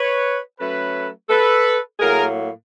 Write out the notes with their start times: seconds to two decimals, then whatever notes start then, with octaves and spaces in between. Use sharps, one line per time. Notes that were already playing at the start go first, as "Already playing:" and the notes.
Already playing: B4 C#5
0.60 F#3 A3 C#4 A4 B4
1.30 A4 B4
2.00 A2 F#3 A#3 G#4 A#4